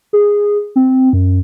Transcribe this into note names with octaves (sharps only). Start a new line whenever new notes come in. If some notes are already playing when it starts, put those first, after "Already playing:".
G#4
C4
F#2